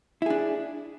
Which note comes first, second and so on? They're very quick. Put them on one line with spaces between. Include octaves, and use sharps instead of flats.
E4 G#4 D4